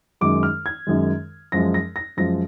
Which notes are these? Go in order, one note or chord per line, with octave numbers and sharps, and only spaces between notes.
F#2 D#3 G#3 D6
F6
G#6
F#2 D#3 G#3
F#2 F3 G#3 A#6
A#6
A#6
F#2 F3 G#3 A#6